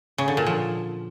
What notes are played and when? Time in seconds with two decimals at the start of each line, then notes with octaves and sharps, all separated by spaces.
0.18 C#3
0.28 D3
0.37 A#2
0.47 F3